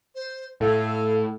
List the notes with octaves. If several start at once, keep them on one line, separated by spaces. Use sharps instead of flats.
C5
A2 A4 F5